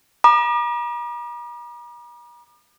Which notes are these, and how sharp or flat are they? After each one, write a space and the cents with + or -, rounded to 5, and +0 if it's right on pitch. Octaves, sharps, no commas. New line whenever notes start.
A#5 +45 D6 +45